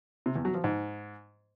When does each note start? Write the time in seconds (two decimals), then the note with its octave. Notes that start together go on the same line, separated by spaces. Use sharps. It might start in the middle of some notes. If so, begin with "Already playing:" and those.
0.26 C3
0.35 E2
0.45 F#3
0.54 F3
0.64 G#2